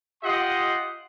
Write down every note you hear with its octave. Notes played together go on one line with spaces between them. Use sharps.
F4 G4 D#5 F#5 C6